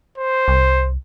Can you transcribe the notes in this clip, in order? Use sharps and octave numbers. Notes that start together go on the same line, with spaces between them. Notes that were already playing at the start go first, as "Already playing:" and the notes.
C5
C2